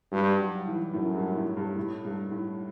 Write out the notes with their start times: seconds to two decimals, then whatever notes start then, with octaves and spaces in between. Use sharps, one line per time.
0.12 G2 G3
0.39 F#3
0.67 E3
0.94 F#2 A2
1.15 G2
1.36 A2
1.57 G2
1.77 A2
2.05 G2
2.31 A2